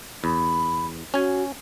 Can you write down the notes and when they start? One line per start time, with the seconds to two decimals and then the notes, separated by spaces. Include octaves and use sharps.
0.24 E2 B5
1.14 C#4 F#4 G#5